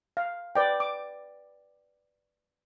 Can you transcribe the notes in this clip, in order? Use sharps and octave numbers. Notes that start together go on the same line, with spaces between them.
F5
B4 D5 G5
D6